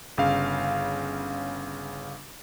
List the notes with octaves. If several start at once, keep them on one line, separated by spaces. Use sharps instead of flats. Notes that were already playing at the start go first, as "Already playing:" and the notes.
G1 C#3 F5